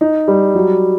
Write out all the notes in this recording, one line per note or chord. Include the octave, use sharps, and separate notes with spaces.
D#4
G3
F#3